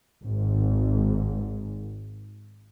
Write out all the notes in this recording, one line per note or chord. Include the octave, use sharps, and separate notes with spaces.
G#1 G#2